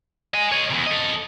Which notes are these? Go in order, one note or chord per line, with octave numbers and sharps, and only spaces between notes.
D#5 G#5
C#5 D#5
E2 C3
A4 D#5